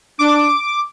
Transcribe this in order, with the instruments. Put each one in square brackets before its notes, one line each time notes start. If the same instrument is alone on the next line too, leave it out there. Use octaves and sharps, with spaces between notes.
[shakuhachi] D4 [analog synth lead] D6